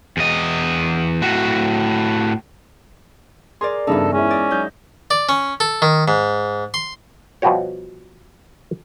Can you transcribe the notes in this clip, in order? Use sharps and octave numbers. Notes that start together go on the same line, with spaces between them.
E2 D#5
A2 F#4
G#4 A#4 D5 C6
E2 G2 C#3 E3 D#4 A4
G#3 C#4 E4
D5 D#5
F#3 D#4 G6
D5
C#4
A4
D#3
G#2
C6
B2 F3 G3 F#4 G4 C#5